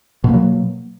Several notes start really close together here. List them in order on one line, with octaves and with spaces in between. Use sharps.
B2 A#3 F#3